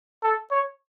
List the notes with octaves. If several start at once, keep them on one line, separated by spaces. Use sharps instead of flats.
A4
C#5